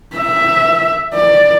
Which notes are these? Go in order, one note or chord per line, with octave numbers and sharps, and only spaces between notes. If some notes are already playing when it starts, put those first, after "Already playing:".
E5
D5